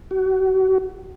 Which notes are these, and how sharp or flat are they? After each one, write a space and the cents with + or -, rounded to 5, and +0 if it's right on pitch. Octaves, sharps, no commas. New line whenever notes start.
F#4 +35